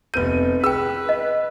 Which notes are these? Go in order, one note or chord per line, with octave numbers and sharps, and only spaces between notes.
F1 B3 B4 G6 D#7
G#4 B4 G5 E6
D#5